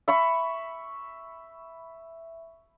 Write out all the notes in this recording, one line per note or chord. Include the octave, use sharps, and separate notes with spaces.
E5 B5 C#6